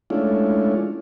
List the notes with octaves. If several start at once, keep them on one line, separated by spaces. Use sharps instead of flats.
G#3 A3 C#4 D4 E4 F4